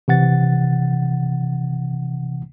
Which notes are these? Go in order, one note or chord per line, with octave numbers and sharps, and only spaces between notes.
C3 E3 F#5 A6